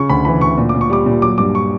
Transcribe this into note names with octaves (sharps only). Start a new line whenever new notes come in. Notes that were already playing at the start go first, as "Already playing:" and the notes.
Already playing: C#3 C#6
D2 B5
E3 B5
D2 C#6
A#2
D6
A#2
C#6
G3 D6
A#2
F#3 D6
G2 D6
C#6